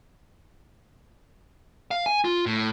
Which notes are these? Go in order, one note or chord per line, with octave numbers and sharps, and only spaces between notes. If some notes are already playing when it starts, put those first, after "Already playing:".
F5
G#5
F4
A2